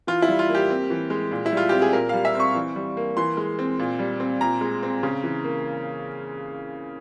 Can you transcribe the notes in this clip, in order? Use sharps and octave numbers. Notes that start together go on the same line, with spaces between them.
E3 F4
E4
G3
F4
A#3
G4
C4
E3
G#3
A#2
E4
G3 F4
C4 G4
G#4
A#2 A#4
G3 F5
E5
C4 C#6
E3
G3
A#3
E3 C6
G#3
C4
A#2
G3
C4
A#2 A#5
G#3
C4
C#3
E3
A#3